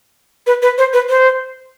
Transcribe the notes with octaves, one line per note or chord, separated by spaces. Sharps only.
B4
B4
C5
B4
C5